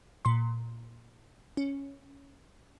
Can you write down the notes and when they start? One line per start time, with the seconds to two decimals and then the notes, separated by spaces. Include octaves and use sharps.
0.25 A#2 C6
1.57 C#4